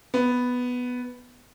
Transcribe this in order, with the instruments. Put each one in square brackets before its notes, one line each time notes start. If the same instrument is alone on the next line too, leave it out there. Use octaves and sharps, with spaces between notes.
[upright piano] B3